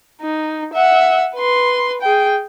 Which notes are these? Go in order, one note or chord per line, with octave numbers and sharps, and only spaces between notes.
D#4
E5 F#5
B4 C6
G#4 G5